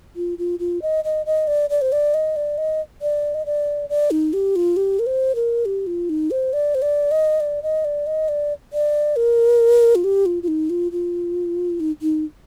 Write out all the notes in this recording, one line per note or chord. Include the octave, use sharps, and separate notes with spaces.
F4
F4
F4
D#5
D#5
D#5
D5
D5
C5
D5
D#5
D5
D#5
D5
D#5
D5
D5
D#4
G4
F4
G4
A#4
C5
A#4
G4
F4
D#4
C5
D5
C5
D5
D#5
D5
D#5
D5
D#5
D5
D5
A#4
F4
G4
F4
F4
D#4
F4
F4
D#4
D#4